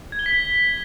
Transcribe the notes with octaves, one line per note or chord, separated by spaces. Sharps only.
G#6
G7
B6